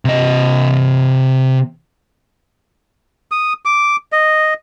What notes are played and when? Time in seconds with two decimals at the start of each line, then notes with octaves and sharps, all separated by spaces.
0.05 C3 D#5
3.31 D#6
3.65 D6
4.12 D#5